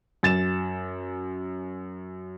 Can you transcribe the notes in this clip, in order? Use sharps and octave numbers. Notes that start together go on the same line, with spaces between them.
F#2 A6 E7